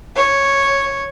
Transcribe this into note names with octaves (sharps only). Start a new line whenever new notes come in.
C#5